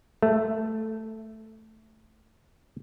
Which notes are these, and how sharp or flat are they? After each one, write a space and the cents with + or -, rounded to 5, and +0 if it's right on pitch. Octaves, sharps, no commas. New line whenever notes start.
A3 +0